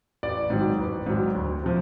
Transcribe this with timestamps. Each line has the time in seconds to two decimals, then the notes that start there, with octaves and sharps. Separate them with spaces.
0.23 A1 D5
0.50 G#2 D#3 F#3
0.79 A1
1.06 G#2 D#3 F#3
1.35 D2
1.63 C3 F3